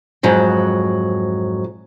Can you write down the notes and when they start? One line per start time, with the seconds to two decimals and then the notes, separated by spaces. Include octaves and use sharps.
0.23 F2 G#2 F#3